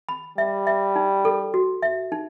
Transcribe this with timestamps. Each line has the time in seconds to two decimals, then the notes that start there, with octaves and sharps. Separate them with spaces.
0.09 B5
0.38 G3 E5
0.67 E5
0.96 D#4
1.25 A4
1.54 F#4
1.82 E5
2.12 D#4